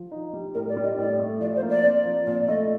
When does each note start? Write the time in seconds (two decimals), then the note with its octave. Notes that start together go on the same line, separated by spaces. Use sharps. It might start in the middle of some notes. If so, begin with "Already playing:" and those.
Already playing: F3
0.12 D#4
0.33 G3
0.54 A2 A#4
0.69 D5
0.77 G3
0.84 D#5
0.98 A2 D5
1.19 A3
1.40 F3 D5
1.56 C5
1.62 A#3
1.70 D5
1.84 C4
2.06 F3
2.26 A#2 D5
2.48 A3 D#5